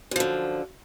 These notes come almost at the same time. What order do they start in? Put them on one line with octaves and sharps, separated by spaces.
F#2 F3 D3